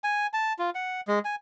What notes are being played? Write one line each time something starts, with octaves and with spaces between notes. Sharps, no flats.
G#5
A5
F4
F#5
G#3
G#5